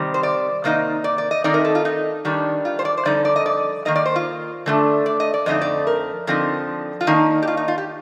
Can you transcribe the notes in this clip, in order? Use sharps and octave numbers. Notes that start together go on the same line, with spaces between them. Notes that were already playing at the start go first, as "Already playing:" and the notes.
Already playing: C3 D#3 G3 C4
C5
D5
C3 D#3 A#3 D#4
D5
D5
D#5
D#3 A3 C4 D#4 D5
A#4
A4
F4
D#4
D#3 G3 D4
F4
C5
D5
C5
F2 D3 G3 D#4 D5
D5
D#5
D5
D#3 A#3 D#4 D#5
D5
C5
F4
D3 A3 D4
D5
D#5
D5
F2 D3 A3 C4 D#4 D#5
D5
A#4
D3 F3 C4 D#4
F4
D#3 A#3 D4 D#4
G4
F4
D#4
F4
G4